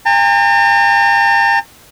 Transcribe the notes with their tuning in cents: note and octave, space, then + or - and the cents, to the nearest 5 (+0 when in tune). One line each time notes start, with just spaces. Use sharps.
G5 +45 A#5 -45